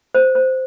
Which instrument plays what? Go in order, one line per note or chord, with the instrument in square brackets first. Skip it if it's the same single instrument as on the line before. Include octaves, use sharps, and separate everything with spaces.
[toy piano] C5
C5